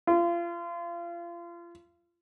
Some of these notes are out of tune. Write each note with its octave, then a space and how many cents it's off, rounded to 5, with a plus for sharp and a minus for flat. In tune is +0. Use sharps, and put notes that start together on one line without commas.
F4 -30